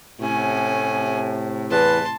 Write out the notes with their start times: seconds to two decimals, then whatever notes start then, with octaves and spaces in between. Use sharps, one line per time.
0.20 A2 C3 C#4 G#5
1.71 E2 B4 A5 C6